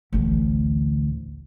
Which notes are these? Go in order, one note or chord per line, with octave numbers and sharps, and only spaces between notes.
A1 D2